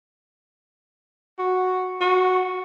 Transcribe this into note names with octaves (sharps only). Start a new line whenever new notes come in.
F#4
F#4